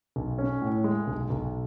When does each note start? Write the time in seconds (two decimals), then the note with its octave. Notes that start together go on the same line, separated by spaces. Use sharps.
0.16 B1
0.38 C#4
0.62 A2
0.84 G#3
1.07 B1
1.30 B1